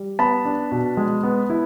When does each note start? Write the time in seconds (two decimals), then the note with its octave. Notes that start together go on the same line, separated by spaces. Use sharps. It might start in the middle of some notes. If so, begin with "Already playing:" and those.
Already playing: G3
0.19 B3 A5 B5
0.45 D4
0.71 B2
0.97 G#3
1.23 B3
1.50 E4